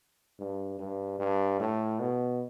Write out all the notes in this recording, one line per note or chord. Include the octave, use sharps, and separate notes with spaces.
G2
G2
G2
A2
B2